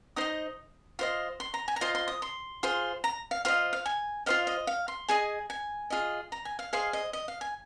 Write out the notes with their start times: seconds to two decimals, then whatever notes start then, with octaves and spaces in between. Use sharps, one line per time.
0.16 D#4 C5 D#5 D#6
0.99 F4 C5 D#5
1.40 C6
1.54 A#5
1.68 G#5
1.76 A#5
1.81 F4 C5 D#5 C6
1.95 C6
2.08 D#6
2.22 C6
2.63 F4 G#4 C5
3.04 A#5
3.31 F5
3.45 F4 C5 D#5 F5
3.73 F5
3.86 G#5
4.26 F4 C5 D#5 F5
4.47 D#5
4.67 F5
4.88 C6
5.08 G#4 D#5 G#5
5.50 G#5
5.90 F4 G#4 D#5
6.32 A#5
6.45 G#5
6.59 F5
6.73 G#4 C5 D#5 F5
6.93 D#5
7.13 D#5
7.28 F5
7.41 G#5